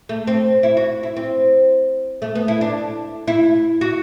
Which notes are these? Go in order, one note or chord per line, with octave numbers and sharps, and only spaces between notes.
A3
C4
E4
F#4
E4
C4
A3
B3
E4
D4
E4
F#4